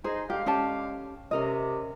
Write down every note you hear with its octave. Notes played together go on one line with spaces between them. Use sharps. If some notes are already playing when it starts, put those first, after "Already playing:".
D#4 G#4 C5
D3 G#3 G4 F5
C#4 G4 A5
C3 C#4 A#4 D#5